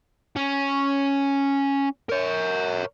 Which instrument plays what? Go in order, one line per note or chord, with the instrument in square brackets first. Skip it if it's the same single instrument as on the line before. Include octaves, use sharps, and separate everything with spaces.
[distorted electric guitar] C#4
A#4 C#5